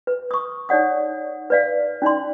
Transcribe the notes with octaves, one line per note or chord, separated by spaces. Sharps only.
B4
C#6 D#6
D#4 C#5 D5 F#5 D#6
B4 D5 F5
C#4 D#4 D5 C6